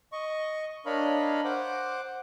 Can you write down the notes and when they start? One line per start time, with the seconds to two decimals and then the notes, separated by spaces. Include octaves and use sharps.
0.12 D#5 C#6
0.86 D4 A#4 C#5 D#5 F5 B5
1.45 C5 F#5 D6